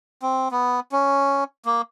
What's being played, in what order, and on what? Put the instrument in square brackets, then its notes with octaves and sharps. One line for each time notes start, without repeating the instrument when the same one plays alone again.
[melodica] C4
B3
C#4
A#3